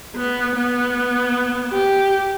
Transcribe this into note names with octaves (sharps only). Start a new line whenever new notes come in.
B3
B3
G4